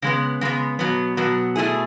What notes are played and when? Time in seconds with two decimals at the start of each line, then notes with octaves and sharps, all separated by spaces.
0.02 C#3 G#3 B3
0.41 C#3 G#3 B3
0.79 B2 F#3 B3
1.17 B2 F#3 B3
1.56 B2 A3 E4 G#4